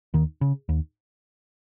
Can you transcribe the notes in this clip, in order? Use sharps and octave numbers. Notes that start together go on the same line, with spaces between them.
D#2 D#3
C#3
D#2